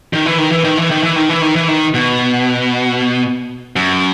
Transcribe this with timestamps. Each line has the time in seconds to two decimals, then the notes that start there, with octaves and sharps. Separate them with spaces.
0.13 D#3
0.26 E3
0.38 D#3
0.52 E3
0.64 D#3
0.77 E3
0.91 D#3
1.03 E3
1.16 D#3
1.29 E3
1.42 D#3
1.56 E3
1.68 D#3
1.94 B2
3.76 F#2